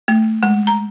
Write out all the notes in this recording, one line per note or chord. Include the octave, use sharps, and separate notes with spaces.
A3
G#3
A#5